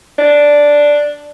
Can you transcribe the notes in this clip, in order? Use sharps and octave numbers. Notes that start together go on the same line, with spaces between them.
D4